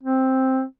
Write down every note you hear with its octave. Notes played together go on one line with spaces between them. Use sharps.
C4